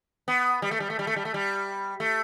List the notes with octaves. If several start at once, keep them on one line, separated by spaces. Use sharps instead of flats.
B3
G3
A3
G3
A3
G3
A3
G3
A3
G3
A3